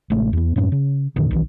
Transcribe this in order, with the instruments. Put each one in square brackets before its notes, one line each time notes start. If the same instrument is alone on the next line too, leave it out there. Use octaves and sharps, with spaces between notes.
[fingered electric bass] A1 C3 G#3 A3
E2 B3
F#2 A2 C#4
C#3
F2 A#2 D3 D#3
B1 D#3 E3